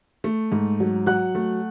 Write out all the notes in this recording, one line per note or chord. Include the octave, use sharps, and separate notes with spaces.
A3
G#2
F#3
F#3 F#5 F#6
A3